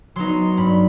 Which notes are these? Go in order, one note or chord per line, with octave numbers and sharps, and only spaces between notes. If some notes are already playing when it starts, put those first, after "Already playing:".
F#3 B3 D#4 C6
G2 B5